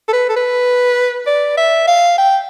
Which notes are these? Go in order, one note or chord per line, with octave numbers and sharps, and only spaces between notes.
A4
B4
A4
B4
D5
E5
F5
G5